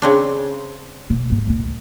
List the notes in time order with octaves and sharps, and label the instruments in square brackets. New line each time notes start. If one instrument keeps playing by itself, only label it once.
[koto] C#3 C4 D4
[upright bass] D#1 B2
G1 G#2
C2 A#2